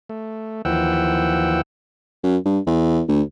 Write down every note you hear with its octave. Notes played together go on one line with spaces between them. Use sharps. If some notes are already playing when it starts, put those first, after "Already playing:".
A3
D#2 E3 F3 F#5 G5 E6
F#2
G2
E2
D2